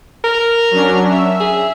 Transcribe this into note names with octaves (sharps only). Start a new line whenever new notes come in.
A#4
F#3 C#4 D4
E5
G#4